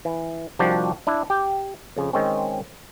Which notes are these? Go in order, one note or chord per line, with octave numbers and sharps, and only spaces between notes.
E3
C2 D#3 F3 D4 F#4 G4
D4 E4
G4
F2 C#3
D#3 G#3 C4 C#4